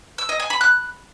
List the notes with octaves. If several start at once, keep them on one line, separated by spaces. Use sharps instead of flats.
E6
D#5
G#5
B5
F#6